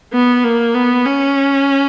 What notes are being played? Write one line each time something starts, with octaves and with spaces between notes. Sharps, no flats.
B3
A#3
B3
C#4